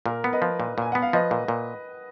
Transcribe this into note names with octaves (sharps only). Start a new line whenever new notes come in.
A#2 A#4
B3
B4 D#5
F3
A#2
A#2 G#5
B3 F#5
F5
F3 B4 D#5
A#2
A#2